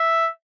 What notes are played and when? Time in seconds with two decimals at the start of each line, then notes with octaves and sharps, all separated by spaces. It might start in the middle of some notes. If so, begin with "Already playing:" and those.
Already playing: E5